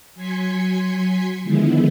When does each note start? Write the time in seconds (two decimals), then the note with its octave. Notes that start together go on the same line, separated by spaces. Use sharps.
0.15 F#3 G#5 C6 G#6 B6 C#7
1.43 D3 D#3 F3 G#3 B3 E4